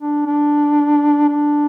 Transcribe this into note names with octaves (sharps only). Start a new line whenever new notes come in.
D4
D4
D4